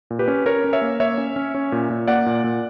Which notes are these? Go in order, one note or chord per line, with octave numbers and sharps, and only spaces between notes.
A#2
G4 B4
C#4
C#4 A#4 C#5
C#4
C#5 E5
A#3
A#3 C#5 E5
C#4
C#4
C#4
A#2
A#2
A#3 D5 F#5
A#2
A#2